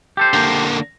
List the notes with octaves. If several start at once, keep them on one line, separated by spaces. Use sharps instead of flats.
G4 A4 C5
D3 A#3